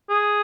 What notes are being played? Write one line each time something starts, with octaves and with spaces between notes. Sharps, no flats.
G#4